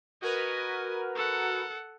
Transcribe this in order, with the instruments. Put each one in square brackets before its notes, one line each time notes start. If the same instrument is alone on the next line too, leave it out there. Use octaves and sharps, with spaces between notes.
[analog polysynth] F#4 A#4 B4 [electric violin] D#5 G#5
[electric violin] A4 F#5